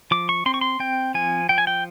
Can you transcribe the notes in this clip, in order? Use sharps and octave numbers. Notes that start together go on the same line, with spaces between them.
F3 D6
C#6
C4 C6
C#6
C6
C4 G5
F3 G#5
F3 G5
G#5
G5